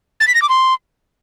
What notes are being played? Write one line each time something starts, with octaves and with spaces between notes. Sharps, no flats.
A6
B6
A#6
D6
C6